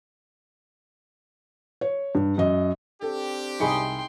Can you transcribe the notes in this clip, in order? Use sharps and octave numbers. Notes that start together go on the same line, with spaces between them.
C#5
G2
F#2 D#5
C4 D4 G4 A4
C2 D#4 G#4 G5 B5 C6 C#7